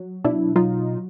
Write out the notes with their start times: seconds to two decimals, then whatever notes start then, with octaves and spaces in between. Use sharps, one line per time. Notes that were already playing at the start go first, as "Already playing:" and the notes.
Already playing: F#3
0.24 B2 D4 E4
0.56 F#3 D#4 F4